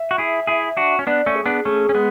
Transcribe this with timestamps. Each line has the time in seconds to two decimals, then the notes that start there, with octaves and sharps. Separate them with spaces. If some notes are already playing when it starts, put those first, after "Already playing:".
Already playing: E5
0.11 F#4
0.18 E4 G#4
0.47 E4 G#4
0.77 D4 F#4
0.99 C#4
1.07 B3 D4 D5
1.26 A3 C#4
1.36 G#4
1.46 B3 D4
1.65 A3 C#4 G#4
1.89 C#4
1.95 G#3 B3